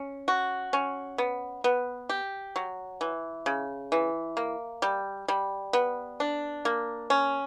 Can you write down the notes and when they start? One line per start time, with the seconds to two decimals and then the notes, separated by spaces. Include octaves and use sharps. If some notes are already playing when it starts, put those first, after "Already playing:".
Already playing: C#4
0.28 F#4
0.73 C#4
1.18 B3
1.64 B3
2.09 G4
2.56 F#3
3.01 E3
3.46 C#3
3.92 E3
4.37 A#3
4.82 G3
5.28 G3
5.73 B3
6.20 D4
6.65 A#3
7.10 C#4